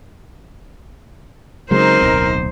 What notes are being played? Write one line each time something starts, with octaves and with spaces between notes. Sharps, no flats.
C#3 F#3 G#3 C4 D#4 A#4 C5
D1 B1